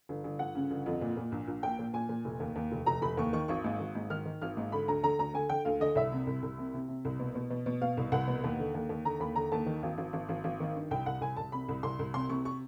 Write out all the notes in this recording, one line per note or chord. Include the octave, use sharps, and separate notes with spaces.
G1
G1
G1 F#5
C#3
G1
F2
A#2
A#2
A#1
A#1
A#2 G5
A#2
A#2 G#5
A#2
F1
D#2
D#2
F1
F1 A#5
F1 B5
D#2 C#6
D#3 C#6
G#1 C#6
G#2
G#1
G#2
D#3 F6
D#3
G#1 F6
G#2
D3 B5
D2 A#5
D3 A#5
D2 A#5
D3 G#5
D3 G5
D2 F5
D3 D#5
C2 E5
C3
C2
C2
C3
C3
C3
C2
B2
B2
B2
B2
B2 F5
C2
C2 F#5
B2
D#2
D3
D#2
D#2
D3 A#5
D#2 B5
D3 A#5
D#2 A5
D#3
G#1
G#1
G#1
G#1
G#1
D#3
G2
C2 G5
C2 F#5
C2 G#5
C2 A5
C3 B5
C2
C2 C6
C2
C3 C6
C3 C#6
C#6